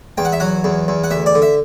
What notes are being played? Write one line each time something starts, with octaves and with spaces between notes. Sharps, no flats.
E2 G5
F#5
E5
F#3 F#5
E2
E2
F#5
D2 E5
D5
D3
E5